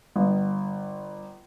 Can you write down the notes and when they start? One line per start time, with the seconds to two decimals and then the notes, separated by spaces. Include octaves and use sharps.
0.16 G1